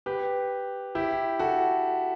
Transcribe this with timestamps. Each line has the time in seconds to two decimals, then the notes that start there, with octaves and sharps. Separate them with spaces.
0.06 G4 B4
0.95 E4 G4
1.39 F#4 A4